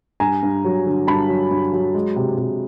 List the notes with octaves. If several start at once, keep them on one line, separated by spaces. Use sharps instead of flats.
G2 G#5 A#5
G2
F#3
D3
G2 A5 B5
F#3
G2
F#3
G#3
C3
C3